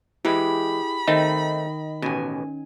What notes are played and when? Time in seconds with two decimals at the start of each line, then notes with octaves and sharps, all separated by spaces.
0.25 E3 G#3 E4 G4 G#4 B5
1.08 D#3 A3 C4 D#4 D#5
2.02 A1 B2 C#4 G#5